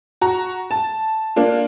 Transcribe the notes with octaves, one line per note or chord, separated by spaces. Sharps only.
F#4 A#5
A5
A#3 D4 F4